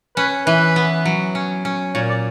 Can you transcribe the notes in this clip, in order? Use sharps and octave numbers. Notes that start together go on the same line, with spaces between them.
C#4 B4
E3 B4
B3
F#3
C#4
C#4
A#2 C#5
D5